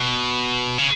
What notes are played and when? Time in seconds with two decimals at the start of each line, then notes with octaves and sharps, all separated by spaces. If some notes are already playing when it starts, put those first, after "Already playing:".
Already playing: B2
0.78 C#3